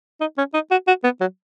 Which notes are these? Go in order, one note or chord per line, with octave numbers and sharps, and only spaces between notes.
D#4
C#4
D#4
F#4
F#4
B3
F#3